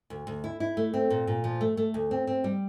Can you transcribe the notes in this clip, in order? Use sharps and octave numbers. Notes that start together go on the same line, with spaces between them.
D2
D2
E4
E4
A3
C4
A#2
A#2
F3
A3
A3
D2
C4
C4
G3